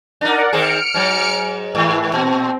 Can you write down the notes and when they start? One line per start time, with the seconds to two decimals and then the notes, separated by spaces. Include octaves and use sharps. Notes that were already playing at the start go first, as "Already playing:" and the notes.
0.21 D4 D#4 A#4 D5 F#5
0.53 D#3 C4 G#4 F6 C#7 D7
0.94 G#2 F#3
1.75 G#2 E3
2.13 A#2 C4